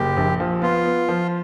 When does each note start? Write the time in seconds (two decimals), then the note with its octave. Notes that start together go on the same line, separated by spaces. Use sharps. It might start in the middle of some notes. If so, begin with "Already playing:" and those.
Already playing: F#1 G4
0.17 A#1
0.40 F3
0.62 B3 F4
0.85 B3
1.09 F3